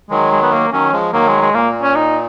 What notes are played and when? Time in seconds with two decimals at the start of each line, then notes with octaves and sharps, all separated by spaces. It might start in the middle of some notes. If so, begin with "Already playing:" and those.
0.10 D#3 F#3 G#3
0.31 G#3
0.42 B3
0.52 A#3
0.72 D#3 F#3 C#4
0.92 F3 G#3
1.13 D#3 F#3 A#3
1.27 G#3
1.41 G#3
1.54 A#2 A#3
1.82 C#4
1.96 D#4